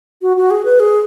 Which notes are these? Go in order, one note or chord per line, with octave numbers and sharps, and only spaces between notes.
F#4
F#4
G#4
B4
G#4